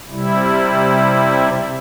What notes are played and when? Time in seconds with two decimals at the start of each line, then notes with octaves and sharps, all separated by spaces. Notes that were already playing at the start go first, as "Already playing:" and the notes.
0.10 C3 G3 E4